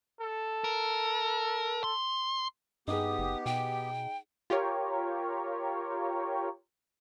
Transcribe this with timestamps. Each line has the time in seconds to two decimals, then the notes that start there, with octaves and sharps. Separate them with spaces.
0.21 A4
0.64 A#4
1.84 C6
2.88 G2 B3 D#4 G4 G#4 D#6
3.18 F#1
3.46 B2 G5
4.50 F4 G4 A#4 C#5